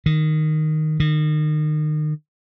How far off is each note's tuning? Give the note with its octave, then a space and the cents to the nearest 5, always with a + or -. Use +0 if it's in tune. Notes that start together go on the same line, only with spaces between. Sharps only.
D#3 -5
D#3 -35